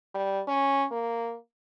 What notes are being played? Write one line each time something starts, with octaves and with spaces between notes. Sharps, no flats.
G3
C#4
A#3